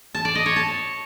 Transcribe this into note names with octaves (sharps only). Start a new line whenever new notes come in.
A5
D5
D#5
C#5
A5